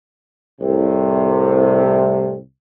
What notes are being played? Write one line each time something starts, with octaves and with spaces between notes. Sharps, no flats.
C2 A2 C3